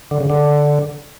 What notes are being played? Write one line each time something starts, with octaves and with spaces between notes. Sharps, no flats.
D3
C#3
D3